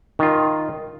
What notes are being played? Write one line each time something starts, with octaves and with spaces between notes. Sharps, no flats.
D#3 F4